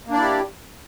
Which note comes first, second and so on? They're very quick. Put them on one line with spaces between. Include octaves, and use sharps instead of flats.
A#3 D4 D5 E4 G4